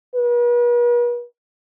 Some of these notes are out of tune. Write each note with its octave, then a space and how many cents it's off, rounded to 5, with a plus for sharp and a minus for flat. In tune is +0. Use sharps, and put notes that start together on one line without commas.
B4 -45